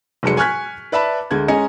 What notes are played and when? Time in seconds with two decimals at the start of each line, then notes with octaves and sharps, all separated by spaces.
0.23 F1 F#3 G#3 C#7
0.37 G#5 C#6 F6 F#6 G#6 B6
0.92 B4 D5 E5 A5 B5
1.31 D2 G#3 G#6
1.48 G#3 C#4 D#5 G#5 A#5 C#7